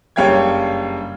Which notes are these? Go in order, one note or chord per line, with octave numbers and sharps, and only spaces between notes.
F#1 G2 C#5 F5 G5 G#6